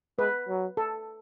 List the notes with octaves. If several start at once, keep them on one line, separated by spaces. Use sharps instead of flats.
G#3 B4
F#3
A4